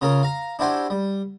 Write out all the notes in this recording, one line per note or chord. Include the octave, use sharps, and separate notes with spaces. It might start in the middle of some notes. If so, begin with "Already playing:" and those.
C#3 C#4 F4 G#4 A#4
F5 A#5
D4 E4 F#4 G4 C5 G#5
G3